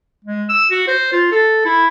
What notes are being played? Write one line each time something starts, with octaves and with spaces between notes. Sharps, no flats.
G#3
E6
F#4
C5
F4
A4
E4